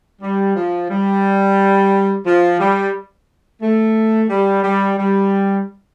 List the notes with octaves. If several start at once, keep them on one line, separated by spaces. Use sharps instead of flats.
G3
F3
G3
F3
G3
A3
G3
G3
G3